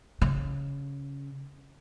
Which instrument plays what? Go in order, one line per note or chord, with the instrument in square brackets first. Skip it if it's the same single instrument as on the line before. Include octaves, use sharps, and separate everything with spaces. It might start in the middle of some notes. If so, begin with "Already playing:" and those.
[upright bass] C#3